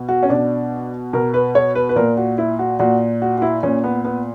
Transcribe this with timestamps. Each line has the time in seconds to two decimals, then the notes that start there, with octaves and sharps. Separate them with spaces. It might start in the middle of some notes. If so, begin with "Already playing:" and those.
Already playing: B2
0.09 F#4
0.23 C#4
0.29 B2 D4
1.13 B2 A#4
1.34 B4
1.55 C#5
1.75 B4
1.89 B4
1.96 A#2 A#4
2.17 F#4
2.38 E4
2.59 F#4
2.79 A#2 F#4
3.22 F#4
3.38 F#4
3.42 E4
3.63 A#2 C#4
3.84 B3
4.05 B3